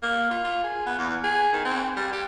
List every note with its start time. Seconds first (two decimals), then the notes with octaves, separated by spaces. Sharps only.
0.02 A#3
0.30 F4
0.44 F4
0.64 G#4
0.86 B3
0.98 E2
1.24 G#4
1.53 D#3
1.65 C4
1.97 G3
2.12 G4